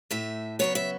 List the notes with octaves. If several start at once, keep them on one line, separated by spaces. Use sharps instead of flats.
A2 A3 E5
C#3 F#3 B3 C#5
E5